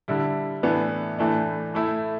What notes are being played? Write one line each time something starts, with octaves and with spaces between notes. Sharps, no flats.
D3 G3 E4
A2 E3 B3 D4
A2 E3 A3 D4
A2 A3 E4